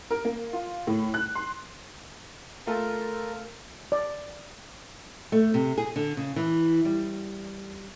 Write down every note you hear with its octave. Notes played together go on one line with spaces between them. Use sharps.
A#4
A#3
F4
A2
F#6
C6
A3 F4 A4 A#4
D5
A3
C3
G#4
D3
C#3
E3
G3